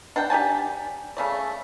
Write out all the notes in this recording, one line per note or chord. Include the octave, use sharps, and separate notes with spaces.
D4 F#5 G5
G4 D5 G#5 A5
C#3 A3 D5